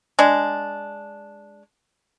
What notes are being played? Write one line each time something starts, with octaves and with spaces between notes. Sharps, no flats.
G#3 D4